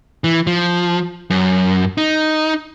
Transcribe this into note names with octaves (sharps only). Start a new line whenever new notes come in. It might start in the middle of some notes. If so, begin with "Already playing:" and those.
E3
F3
F#2
D#4